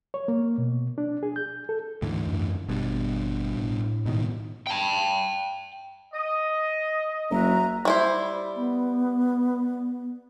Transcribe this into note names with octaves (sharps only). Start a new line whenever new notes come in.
C#5
A#3
B2
D4
G#4
G6
A4
D2 G#2 E3
F#2
G#1 G2 B2
A2
G#2 B2 D#3
G5 A5
D#5
F#1 F#4 E5 A#5
G3 E4 C5
B3